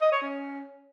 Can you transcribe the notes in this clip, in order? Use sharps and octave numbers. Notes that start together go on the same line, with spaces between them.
D#5
C#5
C#4